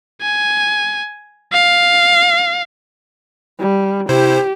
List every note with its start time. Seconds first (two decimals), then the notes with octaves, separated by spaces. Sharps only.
0.22 G#5
1.52 F5
3.59 G3
4.09 C3 E4 G4 C5